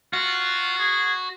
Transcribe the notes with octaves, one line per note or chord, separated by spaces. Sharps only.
F4 F#4
G#4